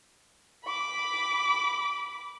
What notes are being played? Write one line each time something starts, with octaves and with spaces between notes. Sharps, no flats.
B5 D6